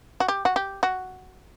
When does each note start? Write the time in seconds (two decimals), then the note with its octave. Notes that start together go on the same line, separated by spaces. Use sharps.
0.20 F#4
0.28 G4
0.45 F#4
0.56 G4
0.83 F#4